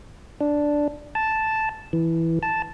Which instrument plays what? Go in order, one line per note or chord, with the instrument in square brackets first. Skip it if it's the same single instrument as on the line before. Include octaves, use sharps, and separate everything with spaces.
[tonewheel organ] D4
A5
E3
A5